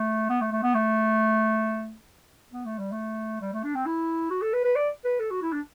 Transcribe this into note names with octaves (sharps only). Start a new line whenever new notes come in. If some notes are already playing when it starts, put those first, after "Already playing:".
Already playing: A3
B3
A3
A3
B3
A3
B3
A3
G3
A3
G3
A3
D4
C4
E4
F#4
A4
B4
B4
D5
B4
A4
F#4
E4
D4